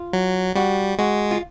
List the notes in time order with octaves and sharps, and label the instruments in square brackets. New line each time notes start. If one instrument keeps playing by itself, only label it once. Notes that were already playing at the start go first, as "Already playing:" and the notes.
Already playing: [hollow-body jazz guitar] F4
[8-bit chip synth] F#3
[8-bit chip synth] G3 [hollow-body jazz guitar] F#4
[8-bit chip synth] G#3 [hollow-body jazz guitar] F#4
[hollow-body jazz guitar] F4